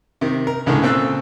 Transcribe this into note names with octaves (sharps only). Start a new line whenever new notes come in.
C3 D#3
A#4
C#2 A2 D3 D#3 G#3
A#2 C#3 C4 A4 E6 F#6